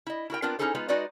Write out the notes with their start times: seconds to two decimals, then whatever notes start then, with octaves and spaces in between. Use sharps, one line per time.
0.07 E4 D#5
0.30 E4 F#4 A#4 G5
0.42 B3 C4 D4 F4 A#4
0.59 C#4 D#4 E4 G#4 A4 C5
0.75 G#3 B3 D#4 F4
0.88 G#3 D#4 F#4 B4 D5 D#5